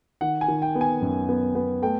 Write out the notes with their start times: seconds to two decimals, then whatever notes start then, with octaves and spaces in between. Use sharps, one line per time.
0.21 D#3 F#5
0.41 G#5
0.48 D#3
0.62 G5
0.75 B3
0.81 G#5
1.01 F#2
1.29 B3
1.55 B3
1.82 A3 G5